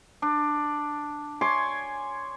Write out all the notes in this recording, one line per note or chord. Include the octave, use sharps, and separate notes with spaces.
D4
C#5 G#5 C6 D6